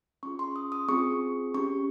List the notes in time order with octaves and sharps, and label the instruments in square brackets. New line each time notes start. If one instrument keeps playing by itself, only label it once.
[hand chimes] C#4 F4 G#4 C#6
C6
D#6
D#6
C4 F4 G#4 C#6
C#4 G4 C#6